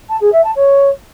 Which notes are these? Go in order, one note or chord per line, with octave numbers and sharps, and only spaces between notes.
A5
G#4
E5
A5
C#5